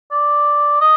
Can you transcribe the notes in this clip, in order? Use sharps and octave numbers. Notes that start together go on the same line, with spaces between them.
D5
D#5